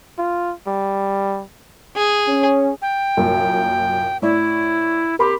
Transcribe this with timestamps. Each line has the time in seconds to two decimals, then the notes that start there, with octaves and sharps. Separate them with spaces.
0.18 F4
0.67 G3
1.96 G#4
2.28 C#4
2.82 G5
3.17 C2 F#2 A#2
4.22 A2 E4 D5
5.19 G4 A#4 B5 C6